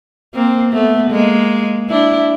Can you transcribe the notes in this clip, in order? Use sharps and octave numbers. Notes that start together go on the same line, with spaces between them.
A#3 C4
A3 B3
G#3 A#3
D4 E4